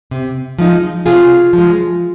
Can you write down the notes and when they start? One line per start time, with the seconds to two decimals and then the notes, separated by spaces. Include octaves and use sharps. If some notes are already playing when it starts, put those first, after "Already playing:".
0.11 C3
0.59 F3 G#3 D#4
1.06 C3 F4 G#4
1.53 F3
1.58 G#3